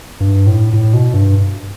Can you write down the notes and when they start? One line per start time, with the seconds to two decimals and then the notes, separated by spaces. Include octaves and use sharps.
0.20 G2
0.47 A2
0.73 A2
0.94 B2
1.14 G2